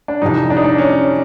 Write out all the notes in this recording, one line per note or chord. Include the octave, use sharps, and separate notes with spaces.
D4
F2 C3 E3 G3 D#4
D4
D#4
D4
C#4